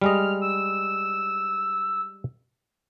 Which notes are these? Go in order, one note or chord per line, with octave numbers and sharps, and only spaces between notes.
G3 G#3 D#5 F6
E6